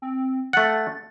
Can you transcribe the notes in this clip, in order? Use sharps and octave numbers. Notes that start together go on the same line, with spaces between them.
C4
A3 F#5 A6